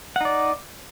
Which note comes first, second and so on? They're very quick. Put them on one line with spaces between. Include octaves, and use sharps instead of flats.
F#5 D#4 D5